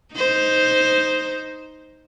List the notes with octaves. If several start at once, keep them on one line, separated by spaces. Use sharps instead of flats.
D#4 C5